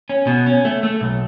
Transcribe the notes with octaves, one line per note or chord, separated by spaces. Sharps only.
C#4
B2
C#4
A3
A3
B1